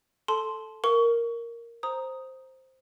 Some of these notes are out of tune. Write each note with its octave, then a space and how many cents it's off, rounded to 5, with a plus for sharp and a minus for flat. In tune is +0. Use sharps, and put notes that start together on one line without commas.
A4 +0 A5 -20 C6 +0
A#4 +0 C#6 +25
C5 +0 A#5 +0 D#6 +5